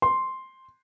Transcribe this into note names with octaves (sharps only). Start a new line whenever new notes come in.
C6